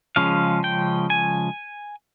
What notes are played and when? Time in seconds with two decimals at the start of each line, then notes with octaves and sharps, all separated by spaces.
0.16 C#3 F3 G#3 C#4 F5
0.64 G5
1.10 G#5